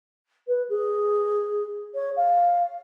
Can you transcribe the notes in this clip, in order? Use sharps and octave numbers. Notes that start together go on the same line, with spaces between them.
B4
G#4
C#5
F5